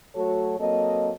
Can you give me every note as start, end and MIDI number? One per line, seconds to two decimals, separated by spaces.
0.15 0.56 54
0.15 0.56 57
0.15 0.56 66
0.15 0.56 69
0.15 0.56 73
0.59 1.11 54
0.59 1.11 58
0.59 1.11 60
0.59 1.11 69
0.59 1.11 75